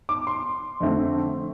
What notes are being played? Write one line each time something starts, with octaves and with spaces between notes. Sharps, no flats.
D6
C6
F2 D3 A3 C4